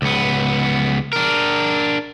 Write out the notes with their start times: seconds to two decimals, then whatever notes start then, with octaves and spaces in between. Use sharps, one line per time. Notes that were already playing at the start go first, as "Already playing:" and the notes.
0.02 C#2 B3
1.13 D4 A#4